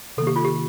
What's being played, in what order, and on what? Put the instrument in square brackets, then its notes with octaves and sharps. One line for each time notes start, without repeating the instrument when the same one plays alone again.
[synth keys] C3 D#3 A#3 [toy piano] A4
[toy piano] G4
F4
G4